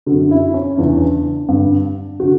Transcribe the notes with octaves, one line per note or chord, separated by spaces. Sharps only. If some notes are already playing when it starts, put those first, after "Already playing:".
F#2 D3 F#4
E4
C#4
E2 C#3 E3 D4
G2 D3
D3 F#4